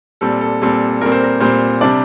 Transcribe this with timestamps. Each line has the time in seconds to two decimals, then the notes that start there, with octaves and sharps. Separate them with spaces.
0.21 A#2 G3 C4 A4
0.41 A4
0.62 A#2 G3 C4 A4
1.01 A#2 G3 C4 A#4
1.12 C5
1.24 A#4
1.40 A#2 G3 C4 C5
1.81 C3 G3 D4 D5